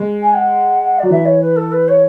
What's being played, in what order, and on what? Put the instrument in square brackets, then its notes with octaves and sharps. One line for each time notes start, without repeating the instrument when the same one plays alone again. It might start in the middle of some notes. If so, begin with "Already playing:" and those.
Already playing: [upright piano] G#3
[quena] G#5
F#5
[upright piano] F#3 [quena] D5
[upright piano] E3 [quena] E5
[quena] C#5
B4
A4
B4
C#5